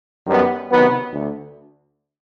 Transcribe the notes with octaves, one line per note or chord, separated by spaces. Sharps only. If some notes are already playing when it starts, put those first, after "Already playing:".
F#2 D#3 G3 B3
C3 D#3 F#3 B3
D2